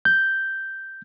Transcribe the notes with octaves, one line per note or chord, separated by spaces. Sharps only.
G6